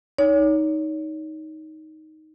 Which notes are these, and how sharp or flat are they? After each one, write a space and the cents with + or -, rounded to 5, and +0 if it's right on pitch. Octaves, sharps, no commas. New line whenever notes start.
D#4 +10 C#5 +35